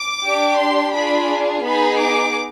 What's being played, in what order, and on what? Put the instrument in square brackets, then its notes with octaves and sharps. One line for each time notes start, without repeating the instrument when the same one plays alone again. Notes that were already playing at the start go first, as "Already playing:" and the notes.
Already playing: [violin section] D6
D4 G4
C6
D4 F4 G#4 B5
B3 D#4 G#4 B5
D6